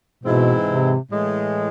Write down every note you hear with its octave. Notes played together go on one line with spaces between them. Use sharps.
G#2 B2 E3 G#3 C4 E4
C3
A2 E3 G#3